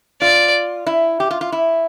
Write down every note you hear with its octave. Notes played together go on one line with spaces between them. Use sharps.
F4 D5
E4
G4
F4
F4
E4